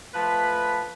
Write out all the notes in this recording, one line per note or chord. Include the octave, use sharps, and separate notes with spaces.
F3 A3 B4